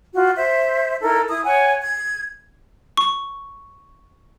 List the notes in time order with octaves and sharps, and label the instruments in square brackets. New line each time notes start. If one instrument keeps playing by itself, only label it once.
[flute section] F4 F#4
C5 E5
D#4 E4 A4 A#4
E4 D#6
C#5 F#5 G#5
G#6
[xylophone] C#6